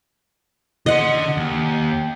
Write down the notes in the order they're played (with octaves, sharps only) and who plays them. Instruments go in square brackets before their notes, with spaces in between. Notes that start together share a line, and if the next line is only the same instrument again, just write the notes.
[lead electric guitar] D3 C6 [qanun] D#5 F#5
[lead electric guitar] D#2